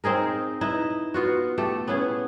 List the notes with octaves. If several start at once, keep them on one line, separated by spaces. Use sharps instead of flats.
C4 D#4 G#4 A#4
D#4 E4 B4
B3 F4 F#4
A3 G4 A4
B3 C#4 E4 G#4